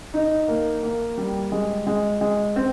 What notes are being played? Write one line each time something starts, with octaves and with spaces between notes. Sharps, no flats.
D#4
A#3
A#3
G3
G#3
G#3
G#3
C4